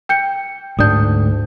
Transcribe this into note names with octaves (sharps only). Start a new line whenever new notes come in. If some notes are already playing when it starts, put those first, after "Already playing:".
G5 G6 C#7
D2 G#2 D4 D#6 G6